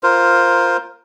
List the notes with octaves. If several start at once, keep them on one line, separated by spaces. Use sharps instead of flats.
F4 A#4 C5